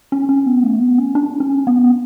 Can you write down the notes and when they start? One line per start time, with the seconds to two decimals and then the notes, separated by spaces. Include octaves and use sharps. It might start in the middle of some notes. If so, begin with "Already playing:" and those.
0.12 C#4
0.29 C#4
0.46 B3
0.63 A3
0.80 B3
0.98 C#4
1.15 D4
1.40 C#4
1.67 B3